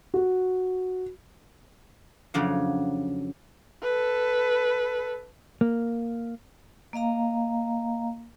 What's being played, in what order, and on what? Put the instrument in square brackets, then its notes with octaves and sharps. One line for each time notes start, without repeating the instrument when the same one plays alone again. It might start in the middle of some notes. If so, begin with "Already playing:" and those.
[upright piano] F#4
[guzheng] F2 C#3 F#3 D4 F5
[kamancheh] A4 B4
[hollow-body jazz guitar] A#3
[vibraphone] A#3 D#5 F5 A#5